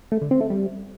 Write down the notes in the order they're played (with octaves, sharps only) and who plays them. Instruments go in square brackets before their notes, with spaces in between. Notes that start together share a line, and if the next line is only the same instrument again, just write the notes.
[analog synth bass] A3
D3
C4
A3
G3